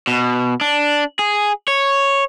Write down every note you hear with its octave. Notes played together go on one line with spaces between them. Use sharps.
B2
D4
G#4
C#5